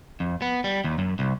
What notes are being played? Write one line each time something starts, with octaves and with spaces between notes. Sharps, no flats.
F2
B3
G3
D#2
F#2
C2